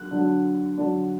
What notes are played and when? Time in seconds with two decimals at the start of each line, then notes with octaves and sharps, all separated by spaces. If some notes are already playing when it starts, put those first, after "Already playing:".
Already playing: D3 F#3 D4 F#6
0.11 D3 F#3 D4
0.78 D3 F#3 D4